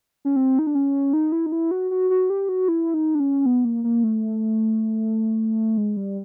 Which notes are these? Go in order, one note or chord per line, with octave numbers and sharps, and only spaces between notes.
C#4
C4
D#4
D4
C#4
D#4
E4
D#4
E4
F#4
F#4
F#4
G4
F#4
E4
D#4
D4
C#4
B3
A#3
A#3
A3
G#3
G3